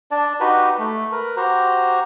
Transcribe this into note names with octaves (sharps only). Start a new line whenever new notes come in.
D4 D5 A5
D#4 F#4 G4 B4
A3
A#4 B4
F#4 G4 C5 A#5